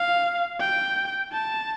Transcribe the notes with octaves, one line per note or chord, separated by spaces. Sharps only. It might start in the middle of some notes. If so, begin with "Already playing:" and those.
Already playing: F5
G5
A5